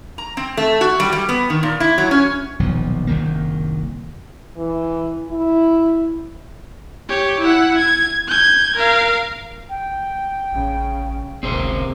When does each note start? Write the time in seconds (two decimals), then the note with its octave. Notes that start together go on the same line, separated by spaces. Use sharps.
0.18 A#5
0.37 C4
0.57 A3
0.81 F#4
1.00 G3
1.13 G3
1.29 B3
1.50 D#3
1.63 A#2
1.80 E4
1.98 F#3
2.11 C#4
2.59 D#1 B1 F3
3.07 F#1 C2 D#3 A#3
4.57 E3
5.29 E4
7.09 G4 C#5
7.40 E4 F#5
7.78 G#6
8.28 G6 G#6
8.76 A#4 F5
9.69 G5
10.52 A1 C#3
11.43 F#1 C#2 C3 A#3 C4 G#4 C5